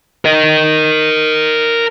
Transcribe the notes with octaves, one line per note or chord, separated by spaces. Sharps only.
A#4 D#5